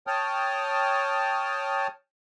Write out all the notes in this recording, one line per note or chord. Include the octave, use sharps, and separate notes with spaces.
C#5 G5 A5 D#6 F6